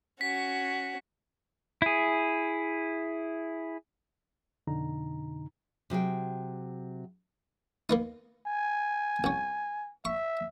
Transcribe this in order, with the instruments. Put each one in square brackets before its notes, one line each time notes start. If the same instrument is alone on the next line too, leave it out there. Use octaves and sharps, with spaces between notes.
[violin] C#4 F#4 [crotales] B6
[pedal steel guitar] E4 G#4
[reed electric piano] F2 B2 D3 D#4 A#5
[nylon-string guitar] C3 F#3 G#4 G5
[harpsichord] A#3 B3 D#4
[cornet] G#5
[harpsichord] C2 C#4
[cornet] E5 [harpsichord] C#6